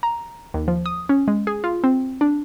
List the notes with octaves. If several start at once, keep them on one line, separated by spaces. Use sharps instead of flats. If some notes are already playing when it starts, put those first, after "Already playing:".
A#5
D#2
F3
D#6
C#4
G#3
G#4
F4
C4
D4